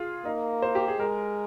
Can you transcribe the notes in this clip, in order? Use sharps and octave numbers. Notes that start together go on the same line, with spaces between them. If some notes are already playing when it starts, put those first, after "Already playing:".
Already playing: F4 G#4
A#3 D#4
C5
G4
G#4
G#3 A#4